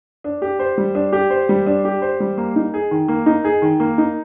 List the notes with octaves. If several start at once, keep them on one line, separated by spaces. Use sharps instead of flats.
D4
G4
C5
G3
D4
G4
C5
G3
D4
G4
C5
G3
A#3
D#4
G#4
D#3
A#3
D#4
G#4
D#3
A#3
D#4